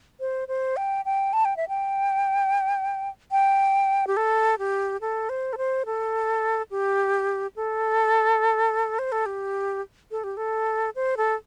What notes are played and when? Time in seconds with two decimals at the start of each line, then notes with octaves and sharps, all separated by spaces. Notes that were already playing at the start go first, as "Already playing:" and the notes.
0.20 C5
0.48 C5
0.77 G5
1.05 G5
1.33 A5
1.45 G5
1.57 E5
1.68 G5
3.31 G5
4.07 G4
4.17 A4
4.59 G4
5.01 A4
5.29 C5
5.53 A4
5.58 C5
5.86 A4
6.71 G4
7.56 A4
8.99 C5
9.12 A4
9.26 G4
10.11 A4
10.24 G4
10.37 A4
10.96 C5
11.17 A4